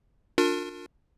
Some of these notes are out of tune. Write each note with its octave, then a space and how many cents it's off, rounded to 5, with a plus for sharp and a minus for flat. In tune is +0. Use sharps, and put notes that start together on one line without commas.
D4 +0 F4 +35 A#4 -25